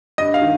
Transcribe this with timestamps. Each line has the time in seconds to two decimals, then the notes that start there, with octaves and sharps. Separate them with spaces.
0.18 G2 D#5
0.34 F5
0.42 D#3